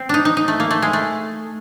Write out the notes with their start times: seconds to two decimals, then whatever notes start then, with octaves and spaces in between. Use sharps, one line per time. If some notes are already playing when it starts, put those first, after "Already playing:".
Already playing: C4
0.09 D4 D#4
0.25 D#4
0.37 D#4
0.48 A3
0.60 A#3
0.71 A3
0.82 G#3
0.93 A3